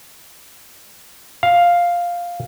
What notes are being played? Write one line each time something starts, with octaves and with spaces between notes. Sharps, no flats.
F5